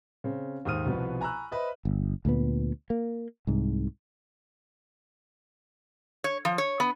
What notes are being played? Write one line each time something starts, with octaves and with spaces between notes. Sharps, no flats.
C#3 C4
D#2 G#2 C5 D#6 F6 D#7
C2 B2 F3 B3 B4
G#5 A#5 B5 C#6 E6 F#6
B4 C5 D#5 E5
G1
D2 A#2 B3
A#3
C2 G#2
C#5
F3
C#5
B3